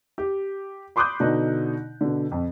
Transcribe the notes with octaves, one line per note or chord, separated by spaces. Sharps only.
G4
B5 C6 D6 D#6 F#6 G6
B2 D3 D4 D#4
B2 D3
F2